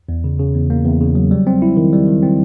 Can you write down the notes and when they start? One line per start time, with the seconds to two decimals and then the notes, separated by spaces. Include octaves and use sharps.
0.09 E2
0.24 C#3
0.40 C#3
0.55 E2
0.70 A#3
0.86 E2
1.01 C#3
1.15 F#3
1.31 G3
1.47 C4
1.62 E4
1.77 D#3
1.93 G3
2.08 D#3
2.23 C4